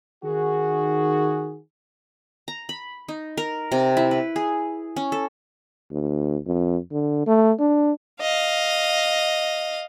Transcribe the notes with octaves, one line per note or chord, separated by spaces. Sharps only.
D#3 F#4 G#4
A#5
B5
D#4
A#4
C3
E4
B4
G#4
C#4
A4
D2
F2
D3
A3
D4
D#5 F5